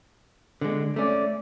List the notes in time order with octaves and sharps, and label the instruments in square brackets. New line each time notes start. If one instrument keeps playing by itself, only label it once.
[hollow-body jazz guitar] D3 G#3
[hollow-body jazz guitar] A3 C#4 [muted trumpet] D5